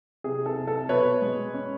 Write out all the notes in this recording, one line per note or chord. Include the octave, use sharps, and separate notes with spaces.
C3 G#4
A4
C3
A4
B2 B4 C#5
G#3
C#4